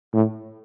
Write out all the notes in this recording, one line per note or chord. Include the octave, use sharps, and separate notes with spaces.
A2